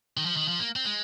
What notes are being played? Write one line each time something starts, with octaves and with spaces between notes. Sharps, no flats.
D#3
F3
D#3
F3
A#3
C4
G#3